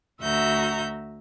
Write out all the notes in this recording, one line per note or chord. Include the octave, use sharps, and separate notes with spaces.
D2 F#4 E5 A#5 G6